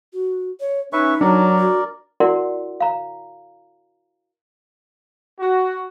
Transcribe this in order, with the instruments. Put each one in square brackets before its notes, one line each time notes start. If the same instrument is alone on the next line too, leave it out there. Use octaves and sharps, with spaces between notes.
[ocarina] F#4
C#5
[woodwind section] C#4 [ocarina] D#4 [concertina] B4 E5 C#6
[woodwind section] F#3 [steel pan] D4 [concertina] A#4 D5
[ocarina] F#4
[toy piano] E4 F#4 A#4 D5 F#5 C6
F5 A#5
[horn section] F#4